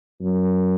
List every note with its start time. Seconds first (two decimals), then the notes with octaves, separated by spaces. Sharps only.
0.20 F#2